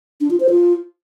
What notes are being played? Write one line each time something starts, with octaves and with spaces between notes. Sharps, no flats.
D4
F4
C5
F4